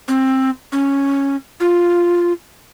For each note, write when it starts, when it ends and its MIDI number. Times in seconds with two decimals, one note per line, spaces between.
0.08 0.50 60
0.72 1.36 61
1.60 2.32 65